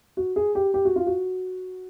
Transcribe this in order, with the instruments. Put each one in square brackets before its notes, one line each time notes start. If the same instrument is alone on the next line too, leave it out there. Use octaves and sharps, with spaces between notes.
[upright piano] F#4
G#4
G4
G4
F#4
F4
F#4